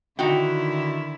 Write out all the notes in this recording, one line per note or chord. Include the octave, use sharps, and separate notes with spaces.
D3 D#3 D#4 E4 F#4 G5